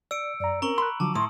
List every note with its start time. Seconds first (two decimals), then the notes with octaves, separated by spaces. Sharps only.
0.11 D5 E6 C#7 D7
0.40 F#2 D5 A#5
0.62 C4 C#4 A#4 A#5 C#6 F#7
0.78 B5 C6 F#6
1.00 D3 F3 F#3 A5 A#5 D6
1.15 A2 C6 C#6 D#6